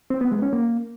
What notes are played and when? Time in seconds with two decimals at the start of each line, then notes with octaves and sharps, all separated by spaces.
0.10 C4
0.21 B3
0.32 G#3
0.42 C#4
0.53 A#3